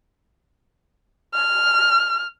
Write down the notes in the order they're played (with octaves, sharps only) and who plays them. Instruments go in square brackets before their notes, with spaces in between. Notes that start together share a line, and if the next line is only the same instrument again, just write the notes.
[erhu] F6